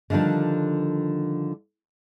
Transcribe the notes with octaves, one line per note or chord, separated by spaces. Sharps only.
D3 D#3 F3 G3 D4